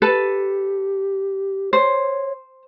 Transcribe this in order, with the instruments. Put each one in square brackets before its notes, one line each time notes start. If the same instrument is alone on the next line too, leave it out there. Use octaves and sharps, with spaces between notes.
[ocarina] G4 [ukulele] A4 B4
[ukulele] C5 [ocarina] C#5